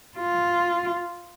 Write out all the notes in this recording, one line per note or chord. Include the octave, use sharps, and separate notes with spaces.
F4